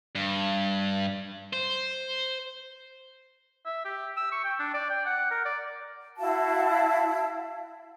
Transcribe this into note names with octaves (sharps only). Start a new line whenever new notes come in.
G2
C5
E5
G4
E6
C#6
G5
D4
D5
G5
F#5
A#4
D5
E4 F#4 F5 A5